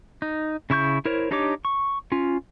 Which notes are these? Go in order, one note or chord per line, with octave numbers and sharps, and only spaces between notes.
D#4
C#3 E4 C#6 G6
E4 A#4 C5 C#5
D4 D#4 G4 C#5 D6
C#6
C#4 F4